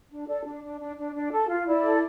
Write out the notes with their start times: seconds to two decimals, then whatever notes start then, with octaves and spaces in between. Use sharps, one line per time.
0.10 D4
0.27 A4 D5
0.45 D4
0.62 D4
0.80 D4
0.96 D4
1.15 D4
1.32 A4
1.48 F4
1.67 E4 D5
1.84 A4